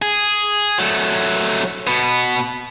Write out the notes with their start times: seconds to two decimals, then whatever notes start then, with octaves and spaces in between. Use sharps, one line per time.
0.02 G#4
0.78 F#3 A3
1.87 B2 B3